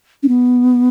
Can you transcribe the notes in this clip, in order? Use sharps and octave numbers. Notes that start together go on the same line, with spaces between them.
C#4
B3